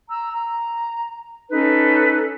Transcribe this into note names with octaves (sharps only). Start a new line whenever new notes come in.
A#5 E6
A#5
C#4 D#4 A4 B4